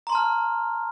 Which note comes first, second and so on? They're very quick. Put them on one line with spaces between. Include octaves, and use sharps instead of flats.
A#5 C6 A5 F6